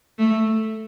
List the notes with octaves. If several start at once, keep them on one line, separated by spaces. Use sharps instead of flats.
A3